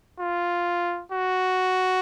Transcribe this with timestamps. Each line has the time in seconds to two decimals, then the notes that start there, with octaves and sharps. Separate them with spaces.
0.20 F4
1.12 F#4